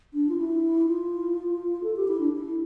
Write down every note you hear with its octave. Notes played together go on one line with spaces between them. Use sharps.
D4
F4
E4
F4
A4
G4
E4
D4
E4